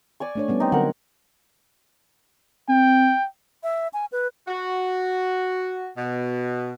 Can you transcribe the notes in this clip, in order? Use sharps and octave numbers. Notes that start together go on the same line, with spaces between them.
D5 G#5 C#6
A3 D4 C#5
G3 B3 C#4
C4 D#4
D3 F#3 C4 A#4 F#5
C4 G5
E5
G#5
B4
F#4
B2